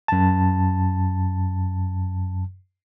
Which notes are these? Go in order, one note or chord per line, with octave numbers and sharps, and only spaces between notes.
F#2 A5